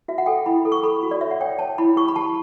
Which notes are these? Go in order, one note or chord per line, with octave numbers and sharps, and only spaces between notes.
F#4 E5
F#5
A4 G5
E4 B5
A4
C#6
A4 B5
F#4
D5
C#5 E5
F#5
C#5 G5
C#5 A5
E4 B5
G4 C#6
B5
G4 A5